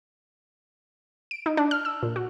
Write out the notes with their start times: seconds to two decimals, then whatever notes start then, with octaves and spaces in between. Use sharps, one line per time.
1.31 D7
1.46 D#4
1.57 D4
1.71 F6
1.85 E6
2.03 A#2
2.16 F#4